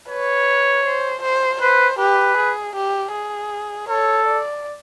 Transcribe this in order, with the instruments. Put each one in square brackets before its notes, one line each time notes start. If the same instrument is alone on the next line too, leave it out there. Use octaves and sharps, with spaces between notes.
[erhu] B4 [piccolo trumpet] C#5
[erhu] C5
C5
[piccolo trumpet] B4 [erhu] C5
[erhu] G4 [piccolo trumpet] B4
[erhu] G#4
G4
G#4
[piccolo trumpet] A4 [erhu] C#5
[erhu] D5